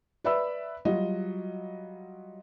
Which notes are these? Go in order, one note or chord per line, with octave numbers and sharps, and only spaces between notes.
B4 D5 E5 B5 E6
F#3 G3 F4 F#4 D#5